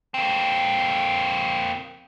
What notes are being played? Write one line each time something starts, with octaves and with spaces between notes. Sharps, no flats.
A#3 C4